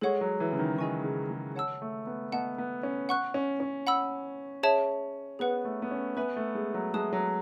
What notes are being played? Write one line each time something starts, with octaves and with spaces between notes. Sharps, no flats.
G#3 A4 C#5 F#5 C#6
F#3
E3
C#3
D#3
D#3 G#4 D#5 G#5 C#6
C#3
G#3
C#5 F#5 A5 E6
A3
B3
B3 D#5 F#5 A5
B3
C#4
F#5 C#6 F#6
C#4
C#4
F#5 B5 E6
G#4 C#5 E5 A5
B3 G#4 B4 F#5
A3
B3
C#4
B3 B4 E5 G#5 B5
A3
G#3
F#3
G#3 E5 A5 D#6 F#6
F#3